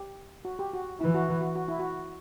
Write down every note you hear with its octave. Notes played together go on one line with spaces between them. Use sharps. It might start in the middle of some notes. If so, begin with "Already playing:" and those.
Already playing: G4
F#4
G4
F#4
E3 E4
F#4
E4
F#4
F#4
E4
F#4